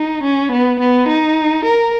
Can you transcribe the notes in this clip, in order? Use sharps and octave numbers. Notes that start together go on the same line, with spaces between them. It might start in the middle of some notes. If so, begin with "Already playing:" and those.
Already playing: D#4
C#4
B3
B3
D#4
A#4